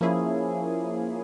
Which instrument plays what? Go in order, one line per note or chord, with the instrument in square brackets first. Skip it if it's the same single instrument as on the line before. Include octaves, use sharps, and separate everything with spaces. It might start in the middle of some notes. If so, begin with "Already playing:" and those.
[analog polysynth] F3 A#3 C#4 E4 G#4